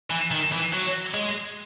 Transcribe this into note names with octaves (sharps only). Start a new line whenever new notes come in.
E3
D#3
E3
F#3
G#3